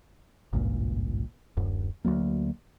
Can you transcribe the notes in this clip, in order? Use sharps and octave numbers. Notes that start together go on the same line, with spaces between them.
G#1 C#2 G2 A#2
D1 F#2
D2 F#3 G3 A#3